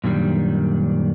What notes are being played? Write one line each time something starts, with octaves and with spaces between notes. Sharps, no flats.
F#2 A#2 D#3 G3 D4